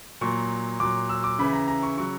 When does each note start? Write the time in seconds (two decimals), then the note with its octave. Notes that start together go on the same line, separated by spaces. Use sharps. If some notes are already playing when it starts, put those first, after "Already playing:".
0.21 A#2 F#3 C#6
0.80 A#2 F#3 D6
1.09 E6
1.24 D6
1.39 C#3 E3 B5
1.53 A#5
1.68 A#5
1.83 C#6
1.97 C#3 F#3 C#6